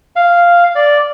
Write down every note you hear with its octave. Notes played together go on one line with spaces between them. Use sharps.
F5
D5